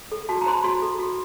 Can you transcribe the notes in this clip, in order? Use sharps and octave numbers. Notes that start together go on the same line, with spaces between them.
A4
F#4 A5
A#5
C5 C6
B5
F#4 C6
A4
F#4